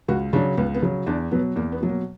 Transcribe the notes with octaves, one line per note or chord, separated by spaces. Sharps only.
C#2 F#4
C#3 F#3 D4
C#2 B3
B3
C#3 F#3
E2 D4
B2 F#3 B3
E2 A#3
B3
B2 F#3
A#3